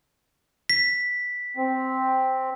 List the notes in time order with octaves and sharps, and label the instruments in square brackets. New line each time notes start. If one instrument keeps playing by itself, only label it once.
[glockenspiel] B6
[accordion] C4